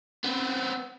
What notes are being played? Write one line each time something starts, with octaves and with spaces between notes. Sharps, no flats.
B3 C4